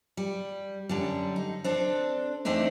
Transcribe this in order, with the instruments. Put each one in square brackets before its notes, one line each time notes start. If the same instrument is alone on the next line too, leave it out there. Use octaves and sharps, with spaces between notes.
[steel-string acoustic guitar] G3
F#2 D3 G3
D#4
C4 D4 A4
E2 A3 C4 D4 D#4